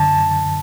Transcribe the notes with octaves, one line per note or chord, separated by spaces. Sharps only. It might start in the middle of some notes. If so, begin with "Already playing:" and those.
Already playing: F#2 D3 A5